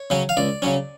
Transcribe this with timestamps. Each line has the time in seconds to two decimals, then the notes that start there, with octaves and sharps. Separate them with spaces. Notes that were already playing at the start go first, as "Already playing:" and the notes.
Already playing: C#5
0.10 C#3 F#3 C#4
0.29 F5
0.37 C#2 D5
0.62 C#3 F#3 C#4